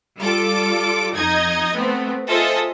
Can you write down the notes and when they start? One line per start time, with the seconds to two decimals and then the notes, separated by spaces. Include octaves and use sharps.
0.19 G3 F4 A4 D6
1.16 F2 D#4 D#5 G#6
1.74 A3 B3 C4
2.29 F4 G#4 A4 C5 D#5 E5